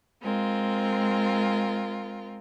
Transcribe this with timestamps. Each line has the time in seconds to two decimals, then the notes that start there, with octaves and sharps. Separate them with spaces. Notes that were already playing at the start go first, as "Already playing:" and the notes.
0.22 G#3 C4 F4 A#4